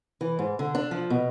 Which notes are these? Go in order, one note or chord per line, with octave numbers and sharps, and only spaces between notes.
E3
G#2
D3
D4
F3
B2